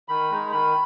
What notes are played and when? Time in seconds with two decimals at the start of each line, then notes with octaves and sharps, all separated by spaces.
0.08 D#3 B5
0.31 G#3 D#4
0.52 D#3 B5